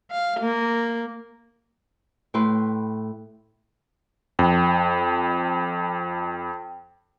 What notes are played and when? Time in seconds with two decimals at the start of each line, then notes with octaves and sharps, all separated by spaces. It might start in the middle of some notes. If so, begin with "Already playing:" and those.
0.11 F5
0.40 A#3
2.34 A2 E4 B4 G5 B5 C6
4.39 F2 G5